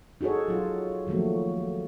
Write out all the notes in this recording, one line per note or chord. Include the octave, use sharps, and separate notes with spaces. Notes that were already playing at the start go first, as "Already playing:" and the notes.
D#4 F#4 G#4 A4 C#5
F#3 F4
D#3 F3 F#3 A3 A#3